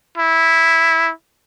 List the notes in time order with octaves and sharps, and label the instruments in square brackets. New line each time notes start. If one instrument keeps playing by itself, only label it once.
[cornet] E4